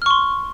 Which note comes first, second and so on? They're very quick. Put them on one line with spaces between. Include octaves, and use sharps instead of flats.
F6 C#6 C6